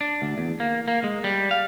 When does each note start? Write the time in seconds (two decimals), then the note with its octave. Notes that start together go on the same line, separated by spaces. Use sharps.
0.01 D4
0.22 D2
0.38 E2
0.60 A#3
0.88 A#3
1.04 G#3
1.24 G3
1.51 F5